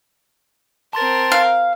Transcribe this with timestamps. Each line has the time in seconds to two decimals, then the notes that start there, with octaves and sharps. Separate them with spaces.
0.93 C4 A#4 A5 C6 A6
1.32 F5